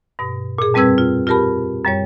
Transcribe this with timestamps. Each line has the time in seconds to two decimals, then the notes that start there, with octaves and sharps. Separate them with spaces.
0.19 G2 B2
0.58 A#2 G#4
0.74 F2 G3 C4 B4 E6 G#6
0.98 F4
1.27 F4 G4 A#4 A5 B5
1.85 F#2 G3 C#5